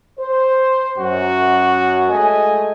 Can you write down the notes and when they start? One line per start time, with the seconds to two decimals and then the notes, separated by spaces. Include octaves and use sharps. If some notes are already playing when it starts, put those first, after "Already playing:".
0.19 C5
0.98 F#2 F#4
2.10 G#3 A3 D#5 G#5